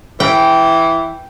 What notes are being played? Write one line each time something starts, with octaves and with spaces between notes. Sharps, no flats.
E3 G5